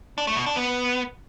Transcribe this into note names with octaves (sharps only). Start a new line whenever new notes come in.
D4
A3
B2
D4
B3